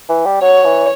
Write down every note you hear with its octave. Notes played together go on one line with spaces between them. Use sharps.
E3
G3
F#3 C#5
E3